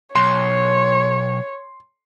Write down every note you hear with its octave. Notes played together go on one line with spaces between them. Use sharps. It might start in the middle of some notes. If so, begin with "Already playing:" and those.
B1 C#5 C6